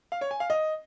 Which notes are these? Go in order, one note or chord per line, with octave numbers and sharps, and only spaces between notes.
F5
C#5
G#5
F5
D#5